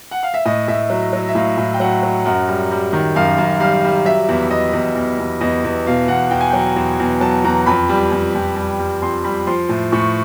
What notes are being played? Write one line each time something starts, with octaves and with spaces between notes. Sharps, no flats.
F#5
F5
E5
A2 D#5
A2 E5
F#3
F#3
E5
A2 F5
A2
G5
F#3 F#5
F#3
F#2 F#5
G3
G3
D#3
F#2 F5
F#2
G3 F5
G3
F#3 E5
E2
E2 D#5
E2
E2
E2
E2 D#5
E2
B2 F5
E2 F#5
E2 G5
G#5
F#3 G5
E2
E2
F#3 A5
E2 A#5
F2 B5
G3
F2
F2
G3
G3
F2 C6
G3 B5
F3 C6
A2
A2 C#6